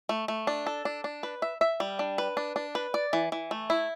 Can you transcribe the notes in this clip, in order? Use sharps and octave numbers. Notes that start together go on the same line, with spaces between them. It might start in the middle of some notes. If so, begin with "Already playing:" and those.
A3
A3
D4
A4
D4
D4
B4
E5
E5
G3
D4
B4
D4
D4
B4
D5
E3
E3
A3
E4